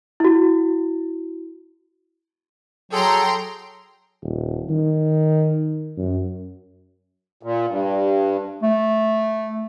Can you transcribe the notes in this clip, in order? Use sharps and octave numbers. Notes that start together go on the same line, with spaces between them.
E4 F#4
F#3 G#4 A4 G5 A#5 C6
D#1
D#3
F#2
A#2
G2
A3